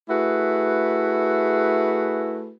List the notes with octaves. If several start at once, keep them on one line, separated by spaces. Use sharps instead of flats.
A3 E4 F#4 G#4 B4